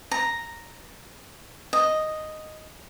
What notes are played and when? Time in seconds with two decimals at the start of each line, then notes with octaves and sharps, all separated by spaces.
0.11 A#5
1.73 D#5